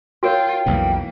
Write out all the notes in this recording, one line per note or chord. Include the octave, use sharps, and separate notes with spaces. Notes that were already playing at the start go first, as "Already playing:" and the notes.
F4 F#4 A#4 C#5 G5
B1 F2 B2 E3 A#3